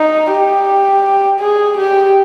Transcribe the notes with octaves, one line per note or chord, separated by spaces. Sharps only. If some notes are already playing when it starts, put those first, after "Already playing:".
Already playing: D#4
G4
G#4
G4